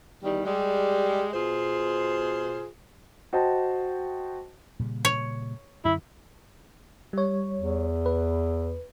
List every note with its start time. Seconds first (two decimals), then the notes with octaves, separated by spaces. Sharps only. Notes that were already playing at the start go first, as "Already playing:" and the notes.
0.23 E2 D#3 G3
0.44 G3 G#3
1.33 B2 F4 G#4 C5
3.33 F#4 C5 D#5 G5 A5
4.79 A#2 C#3 G3
5.05 C#5
5.85 F#2 D3 E4
7.13 G3 C#5
7.57 E2
8.06 B4